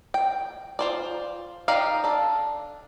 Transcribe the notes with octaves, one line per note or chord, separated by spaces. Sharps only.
G5
F4 C5 D5
D#4 G4 D5 D#5 F5
D4 A4